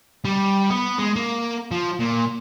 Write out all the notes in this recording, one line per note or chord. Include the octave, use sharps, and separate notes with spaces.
G3
B3
G#3
A#3
F3
A#2